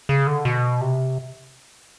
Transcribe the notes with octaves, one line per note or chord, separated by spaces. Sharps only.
C#3
D3
B2
C3